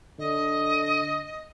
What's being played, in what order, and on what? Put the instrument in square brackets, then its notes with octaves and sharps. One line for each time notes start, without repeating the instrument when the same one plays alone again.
[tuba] D3 [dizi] D#5